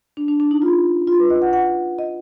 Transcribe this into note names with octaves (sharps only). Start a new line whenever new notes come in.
D4
D4
D4
D#4
F4
F4
B4
D#5
F#5
F#5
D#5